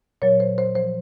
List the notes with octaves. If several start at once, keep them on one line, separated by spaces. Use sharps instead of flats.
A#2 F#3 C#5
C5
C5
F3 C5